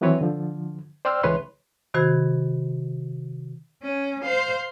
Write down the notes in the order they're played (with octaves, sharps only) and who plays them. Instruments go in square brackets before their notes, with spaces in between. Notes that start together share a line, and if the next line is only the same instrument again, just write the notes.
[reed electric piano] D#3 E3 F#3 C4 B4 C#5
D3 F3
C5 D5 G5 C6 E6 F6
C#2 E3 G#3 B4 C#5 C6
[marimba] C3 D#3 F#4 C5 B5 G#6
[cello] C#4
C5 F5